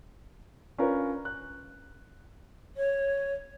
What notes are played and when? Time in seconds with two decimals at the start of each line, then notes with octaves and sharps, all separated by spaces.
0.78 C#4 D4 F4 A#4 B4 C#5
1.25 F#6
2.76 C#5